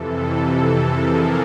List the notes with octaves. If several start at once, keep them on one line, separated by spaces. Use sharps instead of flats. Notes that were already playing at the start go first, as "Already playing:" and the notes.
Already playing: F2 C3 E3 A4
A4
G#4 A#4